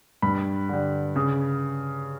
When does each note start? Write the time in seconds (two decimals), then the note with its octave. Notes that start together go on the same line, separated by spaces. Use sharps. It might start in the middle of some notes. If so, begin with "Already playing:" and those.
0.22 G2 B5
0.69 D3 G3
1.16 C#3